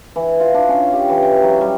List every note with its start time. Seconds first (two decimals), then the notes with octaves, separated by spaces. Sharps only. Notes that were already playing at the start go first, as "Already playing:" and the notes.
0.16 E3
0.40 F4
0.54 D4
0.69 C#4
0.93 G4
1.09 E3
1.23 G5
1.43 F#3
1.61 G3